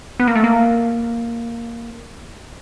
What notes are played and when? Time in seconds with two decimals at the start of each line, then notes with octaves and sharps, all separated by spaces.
0.20 B3
0.27 A#3
0.35 A3
0.44 A#3